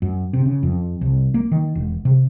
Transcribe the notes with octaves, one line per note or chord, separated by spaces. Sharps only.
F#2
C3
C#3
F2
C2
A#3
D#3
E1
C3